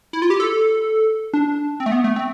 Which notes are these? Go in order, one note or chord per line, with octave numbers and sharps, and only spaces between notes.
E4
F4
G4
A4
D4
C4
A3
B3
A3
C4